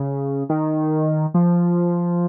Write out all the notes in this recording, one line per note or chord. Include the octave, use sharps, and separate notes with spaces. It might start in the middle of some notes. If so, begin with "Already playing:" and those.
Already playing: C#3
D#3
F3